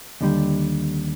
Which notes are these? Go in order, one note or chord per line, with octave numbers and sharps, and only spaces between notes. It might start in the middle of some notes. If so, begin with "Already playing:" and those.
D#2 D3 G3